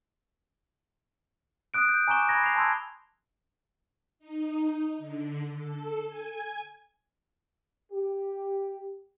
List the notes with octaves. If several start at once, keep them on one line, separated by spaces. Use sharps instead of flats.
D#6 F#6 D7
G6
G#5 A#5 C#6 D6 E7 G7
B5 G#6 A#6
C7 F7
A5 C6 E6 G#6
D#4
D3
A4
G#5
G4